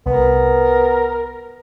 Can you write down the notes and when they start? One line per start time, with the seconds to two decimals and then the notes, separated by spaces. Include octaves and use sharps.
0.06 C2 B3 A#4